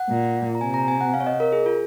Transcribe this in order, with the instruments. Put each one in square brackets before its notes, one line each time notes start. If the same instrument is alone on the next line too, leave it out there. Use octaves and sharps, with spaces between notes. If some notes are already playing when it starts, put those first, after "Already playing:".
Already playing: [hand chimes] F#5
[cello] A#2
[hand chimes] A#5
[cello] C3 [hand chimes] G#5
[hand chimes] A#5
G#5
F#5
F5
C#5
D#5
A#4
G#4
F4